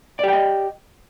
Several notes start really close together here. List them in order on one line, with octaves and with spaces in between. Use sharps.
D5 G4 G5 D#5